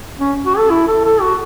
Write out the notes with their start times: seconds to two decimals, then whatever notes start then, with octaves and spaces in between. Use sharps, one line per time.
0.19 C#4
0.45 F#4
0.58 A4
0.70 E4
0.88 A4
1.05 A4
1.22 F#4